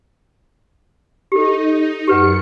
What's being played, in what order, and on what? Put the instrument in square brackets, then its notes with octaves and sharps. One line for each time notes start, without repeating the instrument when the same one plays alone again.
[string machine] D#4 [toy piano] G4 A4
[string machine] F#2 C#7 [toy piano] G4 B4 F#5